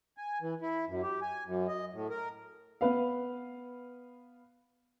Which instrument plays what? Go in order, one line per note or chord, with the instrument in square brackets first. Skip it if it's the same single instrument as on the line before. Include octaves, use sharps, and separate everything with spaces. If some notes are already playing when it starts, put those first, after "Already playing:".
[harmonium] G#5
E3
E4
F#2
G4
G#5
F#2
D#5
A2
A#4
[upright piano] B3 B4 F5